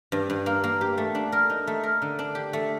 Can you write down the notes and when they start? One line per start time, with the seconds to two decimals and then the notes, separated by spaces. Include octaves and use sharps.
0.12 G2
0.30 G2
0.46 A#3
0.64 A#3
0.81 G4
0.98 A3
1.15 D4
1.32 A#4
1.50 D#4
1.67 A3
1.83 A#4
2.02 D3
2.19 D4
2.35 G4
2.53 A3